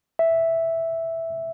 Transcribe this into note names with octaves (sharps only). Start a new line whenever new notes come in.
E5